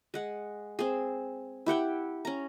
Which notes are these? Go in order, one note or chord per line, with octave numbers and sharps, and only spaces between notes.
G#3 F#5
C4 G#4
E4 G4 F#5 G5
C#4 A#5